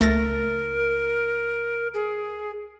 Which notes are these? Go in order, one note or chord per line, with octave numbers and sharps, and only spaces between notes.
C#2 A3 D#4 A#4 A6 A#6
G#4